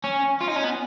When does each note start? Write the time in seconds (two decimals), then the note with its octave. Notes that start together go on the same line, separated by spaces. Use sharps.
0.04 C#4
0.41 F4
0.48 D#4
0.56 C#4
0.64 B3